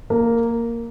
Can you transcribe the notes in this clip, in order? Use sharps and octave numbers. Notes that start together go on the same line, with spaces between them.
A#3